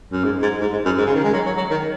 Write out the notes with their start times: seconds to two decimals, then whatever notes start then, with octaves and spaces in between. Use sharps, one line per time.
0.12 F#2
0.24 G#2
0.42 G#2
0.61 G#2
0.72 G#2
0.85 F#2
0.97 G#2
1.06 C#3
1.15 D#3
1.24 G#3
1.33 F#3
1.46 F#3
1.57 F#3
1.70 D#3